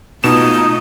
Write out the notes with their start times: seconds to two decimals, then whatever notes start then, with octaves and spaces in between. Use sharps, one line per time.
0.24 B2 A3 D#4 F4 D#5 E7